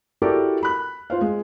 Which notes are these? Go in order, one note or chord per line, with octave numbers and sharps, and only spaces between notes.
E4 F#4 G4 A4 A#4 D5
B5 F#6
F4 C5 F5
G#3